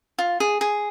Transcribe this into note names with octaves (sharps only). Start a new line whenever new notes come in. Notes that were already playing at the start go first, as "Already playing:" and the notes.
F4
G#4
G#4